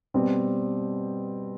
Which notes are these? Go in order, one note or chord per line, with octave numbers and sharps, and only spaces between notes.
B2 G3 C4